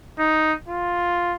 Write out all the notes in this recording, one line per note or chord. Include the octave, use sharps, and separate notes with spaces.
D#4
F4